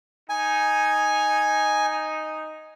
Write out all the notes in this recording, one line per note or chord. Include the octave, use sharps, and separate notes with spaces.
D#4 G#5